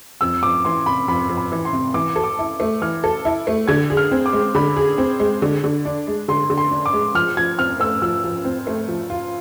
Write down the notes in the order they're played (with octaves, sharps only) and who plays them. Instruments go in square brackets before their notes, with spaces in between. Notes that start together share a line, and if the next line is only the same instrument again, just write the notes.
[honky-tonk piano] F2 [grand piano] E6
[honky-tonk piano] F2 [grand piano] D6
[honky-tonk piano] E3 [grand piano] C6
[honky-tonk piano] C3 [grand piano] B5
[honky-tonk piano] F2 [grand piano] B5
[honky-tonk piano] F2
[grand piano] B5
[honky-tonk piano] E3
[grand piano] C6
[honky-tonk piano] C3
[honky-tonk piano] E3 [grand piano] D6
[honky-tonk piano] A4
[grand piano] D6
[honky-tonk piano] E4
A3
[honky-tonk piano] E3 [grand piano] F6
[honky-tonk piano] A4
E4
A3
[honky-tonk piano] D3 [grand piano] G#6
[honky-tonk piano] G#4
[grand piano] F6
[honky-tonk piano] C4
[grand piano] D6
[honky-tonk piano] G#3
[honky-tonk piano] D3 [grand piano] B5
[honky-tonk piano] G#4
C4
G#3
D3
D3
D4
G#3
[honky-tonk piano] D3 [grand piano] C6
[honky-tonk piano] D3
[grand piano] C6
[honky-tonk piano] D4
[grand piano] D6
[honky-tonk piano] G#3
[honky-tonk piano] F3 [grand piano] F6
[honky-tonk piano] F3 [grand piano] G#6
[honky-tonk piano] C4 [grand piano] F6
[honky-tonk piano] A3 [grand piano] E6
[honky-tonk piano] F3 [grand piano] E6
[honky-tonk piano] F3
C4
A3
F3
F4